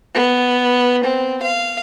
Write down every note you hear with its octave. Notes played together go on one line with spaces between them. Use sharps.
B3
C4
F5